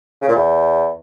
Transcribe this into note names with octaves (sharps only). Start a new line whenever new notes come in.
C#3
A#2
E2